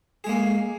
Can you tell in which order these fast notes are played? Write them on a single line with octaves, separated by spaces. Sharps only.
G#4 G#3 A#3